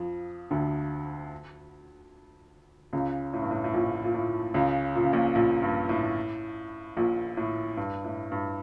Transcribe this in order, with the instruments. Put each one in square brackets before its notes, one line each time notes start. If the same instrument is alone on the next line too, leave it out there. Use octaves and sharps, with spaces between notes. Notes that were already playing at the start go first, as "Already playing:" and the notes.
Already playing: [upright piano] F2 F3
D2 D3
C#2 C#3
A2
G2
A2
A2
A#1 A#2
A#2
A2
C#2 C#3
A#2
C#3
A#1 A#2
A#1 A#2
G2
A2
A#1 A#2
A2
G2
A2
G2